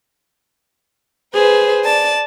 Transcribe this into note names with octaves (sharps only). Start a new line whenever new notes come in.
G#4 B4 C5
D5 A5